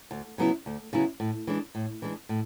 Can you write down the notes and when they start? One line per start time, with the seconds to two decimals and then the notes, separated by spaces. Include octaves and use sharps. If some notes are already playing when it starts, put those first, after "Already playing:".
0.11 D2
0.38 C#3 F#3 B3 E4
0.66 D2
0.93 C#3 F#3 B3 E4
1.20 A2
1.47 E3 G#3 D4
1.75 A2
2.02 E3 G#3 D4
2.29 A2